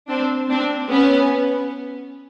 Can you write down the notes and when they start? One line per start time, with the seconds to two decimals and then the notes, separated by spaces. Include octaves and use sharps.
0.09 C4 D4
0.50 C4 D4
0.91 B3 C#4